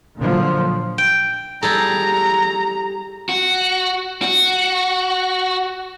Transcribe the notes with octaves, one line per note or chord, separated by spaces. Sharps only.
A#2 D3 F3 F#3
G5
G3 G#4 A4 A#5
F#4
F#4